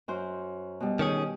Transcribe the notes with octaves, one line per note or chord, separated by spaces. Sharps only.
F#2 F#4 C5
B2 G3
D#3 C#4 G#4